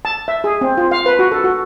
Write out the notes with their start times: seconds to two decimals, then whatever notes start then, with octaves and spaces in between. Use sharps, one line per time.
0.05 A5
0.28 E5
0.44 G#4
0.61 C4
0.78 F4
0.91 F5
1.06 B4
1.19 F#4
1.32 A4
1.44 F#4